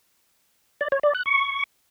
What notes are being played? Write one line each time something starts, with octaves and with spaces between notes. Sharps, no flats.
D5
C#5
D5
F#6
C#6